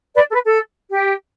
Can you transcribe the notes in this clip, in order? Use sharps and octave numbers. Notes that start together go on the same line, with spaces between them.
B4 D5
A4
B4
A4
G4